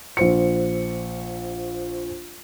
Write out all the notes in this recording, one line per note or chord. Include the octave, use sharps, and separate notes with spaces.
A#1 C5 C#7